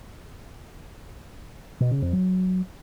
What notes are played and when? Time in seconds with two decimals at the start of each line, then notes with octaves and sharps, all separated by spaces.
1.80 B2
1.91 C#3
2.02 F2
2.13 F#3